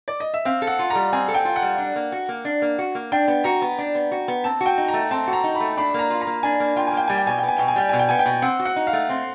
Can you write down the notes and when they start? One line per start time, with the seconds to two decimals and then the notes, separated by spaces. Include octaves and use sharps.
0.08 D5
0.20 D#5
0.34 E5
0.45 C4 F5
0.62 A4
0.67 F#5
0.79 F4
0.90 G3 A#5
1.13 C4 G#5
1.28 A4
1.34 G5
1.45 F4
1.56 F#5
1.62 G3
1.78 D4
1.96 A#3
2.12 F#4
2.29 A#3
2.45 D4
2.62 A#3
2.79 F#4
2.95 A#3
3.12 D4 G5
3.28 B3
3.44 F#4 A#5
3.62 B3
3.78 D4
3.95 B3
4.12 F#4
4.28 B3
4.44 C4 A5
4.61 F#4
4.66 G5
4.78 D#4
4.88 A#5
4.94 A3
5.11 C4 A5
5.27 F#4
5.33 A#5
5.44 D#4
5.55 B5
5.60 A3
5.77 D4 B5
5.94 A#3 A#5
6.10 F4
6.21 A#5
6.27 A#3
6.43 D4 G#5
6.60 A#3
6.76 F4 G5
6.87 G#5
6.93 A#3 G5
7.08 G3 G#5
7.17 G5
7.26 B2 G#5
7.38 G5
7.44 B3 G#5
7.58 B2 G5
7.68 G#5
7.76 G3 G5
7.89 B2 G#5
7.99 G5
8.09 B3 G#5
8.19 G5
8.26 B2
8.42 C4 F#5
8.59 F#4
8.65 F#5
8.76 D#4
8.87 F5
8.93 A3
9.09 C4